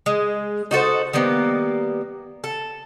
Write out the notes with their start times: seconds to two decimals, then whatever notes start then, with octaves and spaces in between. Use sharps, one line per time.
0.06 G#3
0.71 D#4 F#4 A4 C5
1.13 D#3 G3 A#3 B3
2.44 A4